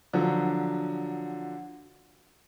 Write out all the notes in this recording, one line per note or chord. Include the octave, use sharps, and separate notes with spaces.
D3 F3 F#3